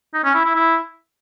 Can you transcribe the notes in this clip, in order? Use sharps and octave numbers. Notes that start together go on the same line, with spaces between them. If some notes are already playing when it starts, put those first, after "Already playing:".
D#4
C#4
E4
E4
E4